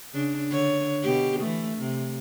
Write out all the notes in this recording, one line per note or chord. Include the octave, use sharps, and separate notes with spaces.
C#3 D4
D3 C#5
B2 G4
E3 A3
C3